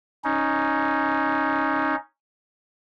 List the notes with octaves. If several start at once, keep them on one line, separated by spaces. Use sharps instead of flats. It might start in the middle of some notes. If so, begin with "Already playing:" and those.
C#4 D#4